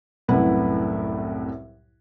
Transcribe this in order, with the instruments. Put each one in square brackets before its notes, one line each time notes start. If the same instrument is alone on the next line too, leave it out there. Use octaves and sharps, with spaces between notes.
[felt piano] C2 F#2 A2 E4 B4 F#5